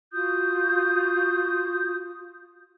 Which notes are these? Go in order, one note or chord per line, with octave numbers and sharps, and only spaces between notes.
F4 F#4 D#6 G6